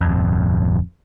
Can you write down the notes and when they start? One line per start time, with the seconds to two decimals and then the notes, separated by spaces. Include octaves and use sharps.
0.01 D1 F2